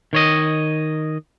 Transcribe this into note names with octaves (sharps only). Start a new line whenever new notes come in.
D#3 C#5 D#5